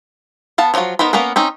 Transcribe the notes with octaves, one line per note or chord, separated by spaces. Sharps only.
B3 F5 A5
F3 F#3 D#4 F4 F#4
B3 D#4 A#4 C5 B5
A#3 B3 C#4 A#4 B4
C4 C#4 D#4